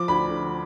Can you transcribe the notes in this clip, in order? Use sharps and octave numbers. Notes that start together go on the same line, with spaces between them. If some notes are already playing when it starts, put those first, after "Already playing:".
Already playing: F3 D6
D2 B5
D3